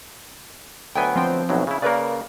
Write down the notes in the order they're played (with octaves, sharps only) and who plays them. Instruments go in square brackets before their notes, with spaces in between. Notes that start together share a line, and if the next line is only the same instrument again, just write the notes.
[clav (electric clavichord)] D2 F#3 B3 [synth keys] G5 G#5
[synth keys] F3 C4 G5
[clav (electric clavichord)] B1 A2 F#3
C#3 E4
[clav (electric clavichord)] C#3 A#3 [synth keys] A#4 B4 D5